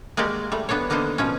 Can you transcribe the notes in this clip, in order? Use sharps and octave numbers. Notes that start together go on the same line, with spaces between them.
G#3 A#3 F#4 G4 D5
G3 A3
B3 D4 A4 C#5
D3 A#3 B3 D4 D#4 C5
B2 F3 C#4